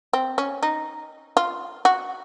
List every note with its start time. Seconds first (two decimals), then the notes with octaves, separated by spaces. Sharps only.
0.13 C4
0.38 C#4
0.63 D#4
1.37 F4
1.85 F#4